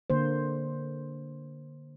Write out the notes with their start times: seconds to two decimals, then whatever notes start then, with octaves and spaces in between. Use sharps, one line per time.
0.10 D3 A#3 C5